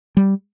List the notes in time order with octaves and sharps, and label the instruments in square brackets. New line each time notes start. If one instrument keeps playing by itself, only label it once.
[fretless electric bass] G3